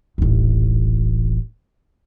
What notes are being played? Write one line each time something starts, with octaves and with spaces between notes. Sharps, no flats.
D#1 A1